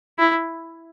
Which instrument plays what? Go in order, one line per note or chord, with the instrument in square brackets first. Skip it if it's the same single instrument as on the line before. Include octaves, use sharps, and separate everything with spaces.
[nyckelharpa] E4